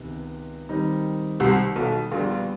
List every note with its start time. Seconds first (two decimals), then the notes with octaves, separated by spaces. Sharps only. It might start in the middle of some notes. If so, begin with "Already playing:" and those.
Already playing: C#2 C3 D#3 G#3 B3
0.69 D#3 G3 C4 D#4
1.40 C2 C3
1.76 B1 B2
2.11 A#1 A#2 D3 G3 B3